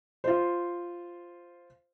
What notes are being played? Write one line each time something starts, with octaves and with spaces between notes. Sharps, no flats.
F4 C5